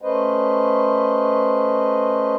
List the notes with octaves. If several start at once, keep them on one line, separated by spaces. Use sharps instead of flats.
A3 C#4 B4 C5 D#5